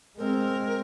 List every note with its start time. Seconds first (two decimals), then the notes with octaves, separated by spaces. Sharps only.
0.18 G#3 C4 A#4